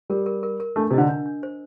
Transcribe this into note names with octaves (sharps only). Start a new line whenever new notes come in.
G3 A#4
A#4
A#4
A#4
A3 D4
C3
D3 D#5
D4
D4
C5